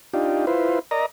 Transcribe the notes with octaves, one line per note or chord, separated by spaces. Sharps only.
D4 D#4 F4 G4
E4 F4 B4 C5
A#4 D5 D#5 A#5